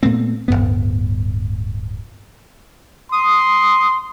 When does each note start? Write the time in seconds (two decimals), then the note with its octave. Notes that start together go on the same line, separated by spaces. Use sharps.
0.03 A#2 A3 B3 C4
0.48 D1 G#1 G2 B3
3.12 C6 D#6